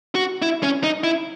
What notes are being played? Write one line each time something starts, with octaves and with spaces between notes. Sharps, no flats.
F#4
E4
C#4
D#4
E4